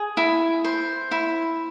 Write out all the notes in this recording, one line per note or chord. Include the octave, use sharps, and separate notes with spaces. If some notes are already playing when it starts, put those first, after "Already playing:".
Already playing: G#4
E4
C5
E4